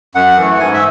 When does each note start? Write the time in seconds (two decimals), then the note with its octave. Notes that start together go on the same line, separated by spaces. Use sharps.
0.15 F#2 F#5
0.37 E3 A3
0.59 G#2 G#5
0.74 E5